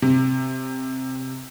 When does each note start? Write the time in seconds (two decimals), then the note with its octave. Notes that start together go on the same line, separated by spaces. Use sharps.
0.02 C3